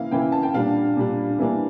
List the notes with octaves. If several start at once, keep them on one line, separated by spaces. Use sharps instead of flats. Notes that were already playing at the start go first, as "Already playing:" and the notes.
Already playing: C#3 E3 A#3 E4 F5
C#3 E3 A#3 E4 G5
A5
G5
A#2 G3 D4 F5
A#2 G3 D4
E3 G3 A#3 D4